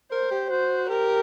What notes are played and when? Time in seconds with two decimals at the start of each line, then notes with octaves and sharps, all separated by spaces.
0.12 A#4 C5
0.31 G4
0.50 F#4 C5
0.89 G4 A#4